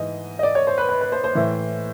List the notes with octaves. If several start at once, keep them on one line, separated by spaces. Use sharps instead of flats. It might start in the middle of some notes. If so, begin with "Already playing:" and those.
Already playing: G#2 E3 D#5
D#5
D5
C#5
C5
B4
B4
B4
C5
C5
A2 E3